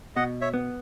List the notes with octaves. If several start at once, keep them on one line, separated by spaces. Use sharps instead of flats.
B2 D#5 F#5
C#5 E5
B3